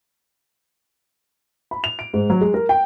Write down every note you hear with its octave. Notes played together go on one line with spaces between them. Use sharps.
B5
F7
D7
G#2
F#3
G#3
A#4
G5